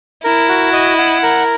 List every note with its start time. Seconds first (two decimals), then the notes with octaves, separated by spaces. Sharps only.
0.24 E4 A#4
0.49 F#4
0.73 D#5
0.98 F#5
1.23 A#4